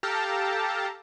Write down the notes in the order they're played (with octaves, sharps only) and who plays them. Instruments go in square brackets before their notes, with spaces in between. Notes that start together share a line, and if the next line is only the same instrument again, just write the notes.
[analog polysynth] G4 A4 F5 G5 A5 A#5